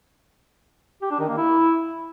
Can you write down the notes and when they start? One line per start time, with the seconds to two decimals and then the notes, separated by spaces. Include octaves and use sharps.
1.02 G4
1.11 D4
1.19 D#3
1.28 A#3
1.37 E4